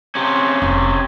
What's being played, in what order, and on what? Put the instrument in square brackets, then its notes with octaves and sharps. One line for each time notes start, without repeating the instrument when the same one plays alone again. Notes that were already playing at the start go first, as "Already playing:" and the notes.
[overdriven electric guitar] C3 C#4
[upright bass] F1